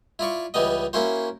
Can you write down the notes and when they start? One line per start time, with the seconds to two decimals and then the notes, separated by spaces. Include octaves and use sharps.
0.19 E4 F4 D5 C#6
0.54 C#2 E3 G3 B3 D#5
0.93 A#3 C#4 E4 F#4 C5